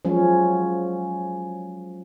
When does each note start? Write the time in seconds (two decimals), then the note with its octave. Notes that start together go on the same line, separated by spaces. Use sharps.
0.05 F3 F#3 G#3 C#4